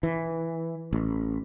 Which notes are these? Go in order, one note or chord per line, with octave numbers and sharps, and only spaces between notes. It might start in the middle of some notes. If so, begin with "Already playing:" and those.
E3
A1